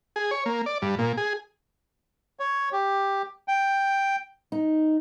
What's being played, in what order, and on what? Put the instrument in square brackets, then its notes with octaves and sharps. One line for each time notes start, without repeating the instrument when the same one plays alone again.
[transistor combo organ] G#4
C#5
A#3
D5
G2
A#2
G#4
[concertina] C#5
G4
G5
[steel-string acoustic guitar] D#4